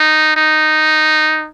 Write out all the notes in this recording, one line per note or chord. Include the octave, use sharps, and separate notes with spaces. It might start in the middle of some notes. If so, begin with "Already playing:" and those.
Already playing: D#4
D#4